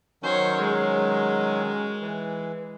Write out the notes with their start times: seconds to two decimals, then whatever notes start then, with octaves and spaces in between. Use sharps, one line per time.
0.23 D#3 F#3 C#4 C5 C#5
0.60 G#3
2.02 E3